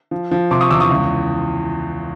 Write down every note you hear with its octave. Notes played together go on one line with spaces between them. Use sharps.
F3
F3
C3 C6 D6
C#6 D#6
E2 D6 E6
C#6 D#6
C#2